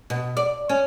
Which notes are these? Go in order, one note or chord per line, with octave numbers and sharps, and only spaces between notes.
B2
D5
C#4